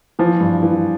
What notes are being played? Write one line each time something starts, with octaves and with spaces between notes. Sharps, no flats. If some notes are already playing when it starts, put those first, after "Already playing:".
E3 F3
G2
E3